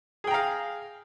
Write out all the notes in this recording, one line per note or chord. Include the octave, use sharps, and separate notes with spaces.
G#4 F5 G5 A#5